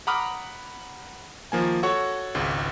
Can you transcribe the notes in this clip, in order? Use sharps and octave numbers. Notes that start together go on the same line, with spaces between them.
F#5 A#5 B5 D6 D#6 F6
D#3 F3 A#3 G#5
F#4 A4 C#5 F#5 C#6
G#1 C#2 G#2